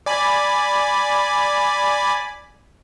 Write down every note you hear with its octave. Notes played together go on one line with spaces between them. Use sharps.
D5 G#5 B5